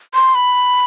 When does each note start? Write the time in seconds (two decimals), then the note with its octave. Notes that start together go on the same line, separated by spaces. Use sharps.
0.14 C6
0.35 B5